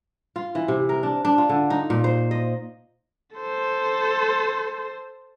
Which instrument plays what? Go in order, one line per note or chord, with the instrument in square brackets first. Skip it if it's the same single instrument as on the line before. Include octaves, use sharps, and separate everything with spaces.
[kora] F4
E3
C3
A#4
D4
D4
F4
D3
D#4
A#2
C5
D#5
[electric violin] A4 C5